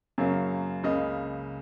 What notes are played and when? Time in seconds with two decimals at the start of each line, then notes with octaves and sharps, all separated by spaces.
0.18 F#2 C#3 F#3 A#3
0.83 C#2 C#3 A#3 D#5